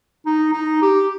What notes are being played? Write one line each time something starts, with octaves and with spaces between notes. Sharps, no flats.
D#4
D#4
G4